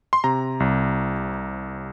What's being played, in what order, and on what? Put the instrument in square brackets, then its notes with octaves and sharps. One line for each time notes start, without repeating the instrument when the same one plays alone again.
[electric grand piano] C6
C3 A#5
C2